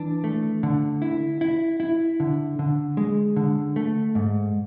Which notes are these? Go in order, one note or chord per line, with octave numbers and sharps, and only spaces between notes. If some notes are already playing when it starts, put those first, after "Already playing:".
Already playing: E3 D4
A3
D3
E4
E4
E4
D3
D3
G#3
D3
A3
G#2